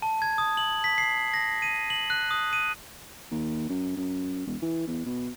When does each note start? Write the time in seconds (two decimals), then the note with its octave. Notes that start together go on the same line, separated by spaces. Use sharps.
0.02 A5
0.22 G#6
0.38 D#6
0.57 F#7
0.84 B6
0.98 C7
1.34 A#6
1.62 D#7
1.90 F#7
2.10 F#6
2.31 D#6
2.53 D#7
3.31 D#2
3.69 F#2
3.97 F#2
4.47 E1
4.62 E3
4.88 E2
5.06 B2